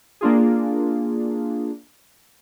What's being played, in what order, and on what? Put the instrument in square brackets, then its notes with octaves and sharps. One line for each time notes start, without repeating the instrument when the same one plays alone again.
[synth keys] A#3 D4 F4 G#4